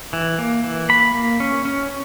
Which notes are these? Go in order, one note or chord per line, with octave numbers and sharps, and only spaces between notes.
E3
A#3
E3
A#3 B5
A#3
C#4
C#4